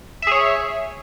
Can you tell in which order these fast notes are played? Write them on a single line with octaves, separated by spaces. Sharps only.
E5 G#4 C#5